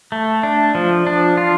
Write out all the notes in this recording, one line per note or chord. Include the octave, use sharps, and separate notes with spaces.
A3
D4
F3
D4
F4